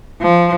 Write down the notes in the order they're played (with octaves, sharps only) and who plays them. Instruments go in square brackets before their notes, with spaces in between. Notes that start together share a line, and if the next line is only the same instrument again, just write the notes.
[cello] F3